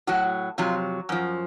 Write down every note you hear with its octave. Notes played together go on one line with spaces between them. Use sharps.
A2 F#3 F#4
F2 C3 F#3 F4
F#2 F3